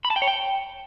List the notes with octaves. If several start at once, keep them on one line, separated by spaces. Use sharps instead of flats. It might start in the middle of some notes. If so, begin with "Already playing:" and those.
B5
A5
G5
C#5
G5